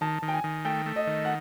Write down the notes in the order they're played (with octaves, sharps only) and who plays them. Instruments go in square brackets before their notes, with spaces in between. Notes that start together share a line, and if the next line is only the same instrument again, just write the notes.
[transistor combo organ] D#3 [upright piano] A5
[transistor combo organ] D#3
[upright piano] G5
G#5
[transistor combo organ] D#3
[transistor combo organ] A3 [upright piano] G5
[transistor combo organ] A3
[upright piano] D#5
[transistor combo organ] D#3
[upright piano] F#5